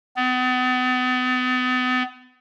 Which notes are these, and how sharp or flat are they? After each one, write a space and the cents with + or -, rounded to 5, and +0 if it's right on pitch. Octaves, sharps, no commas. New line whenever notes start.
B3 +40